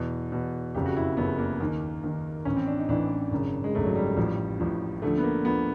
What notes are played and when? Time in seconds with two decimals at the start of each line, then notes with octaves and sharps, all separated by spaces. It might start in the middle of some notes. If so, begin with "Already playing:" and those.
Already playing: E2 B2
0.32 E2 B2
0.75 F#1 F2 C#3 G4
0.86 F#4
0.97 E4
1.17 F#1 F2 C#3 B3
1.38 A#3
1.60 D#2 D#3
2.04 D#2 D#3
2.45 A1 A2 E3 C#4
2.56 C4
2.67 D4
2.79 D#4
2.89 A1 A2 E3 D4
3.31 G#1 F#2 C#3
3.64 G#3
3.75 G#1 F#2 C#3 A3
3.86 F#3
3.95 G3
4.16 A1 A2 F3
4.60 A1 A2 F3
5.02 D2 D3 F3 A3
5.17 B3
5.23 A#3
5.45 D2 D3 F3 B3